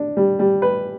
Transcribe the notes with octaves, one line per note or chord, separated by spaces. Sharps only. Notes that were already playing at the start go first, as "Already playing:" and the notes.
Already playing: D4
G3
G3
B4